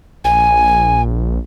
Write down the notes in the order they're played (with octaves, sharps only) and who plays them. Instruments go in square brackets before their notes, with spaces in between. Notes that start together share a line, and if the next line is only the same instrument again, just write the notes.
[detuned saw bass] A#1 [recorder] G#5